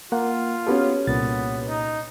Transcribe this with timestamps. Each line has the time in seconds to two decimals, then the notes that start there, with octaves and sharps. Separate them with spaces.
0.12 A#3 F4 F#5
0.67 B3 C#4 F#4 G4 A4
1.07 C2 A#2 B3 A6
1.69 D#4